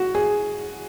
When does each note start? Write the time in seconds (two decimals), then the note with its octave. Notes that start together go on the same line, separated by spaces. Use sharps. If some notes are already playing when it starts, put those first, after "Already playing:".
Already playing: F#4
0.15 G#4